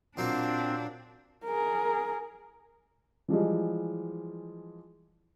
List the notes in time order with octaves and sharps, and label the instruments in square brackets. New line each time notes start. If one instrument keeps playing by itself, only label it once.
[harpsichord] A#2 F#3 A#3 [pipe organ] C4 [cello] D4
[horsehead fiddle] G#4 A#4
[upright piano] E3 F3 G3 G#3